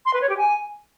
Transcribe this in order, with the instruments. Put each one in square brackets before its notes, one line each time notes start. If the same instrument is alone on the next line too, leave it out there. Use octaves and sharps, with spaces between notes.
[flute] C6
B4
C#5
G4
G#5